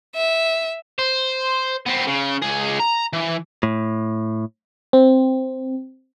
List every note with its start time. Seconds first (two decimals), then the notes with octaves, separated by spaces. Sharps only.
0.15 E5
0.99 C5
1.86 B3 C4
2.07 C#3
2.42 C#2 G#4
2.80 A#5
3.13 E3
3.63 A2
4.93 C4